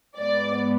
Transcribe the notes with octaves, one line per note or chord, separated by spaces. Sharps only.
G#2 G#3 B3 D5